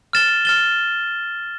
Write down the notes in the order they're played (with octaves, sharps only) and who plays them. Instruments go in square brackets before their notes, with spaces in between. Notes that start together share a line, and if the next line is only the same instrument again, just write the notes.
[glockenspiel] F6 A6 E7 G7
F6 A6 E7 G7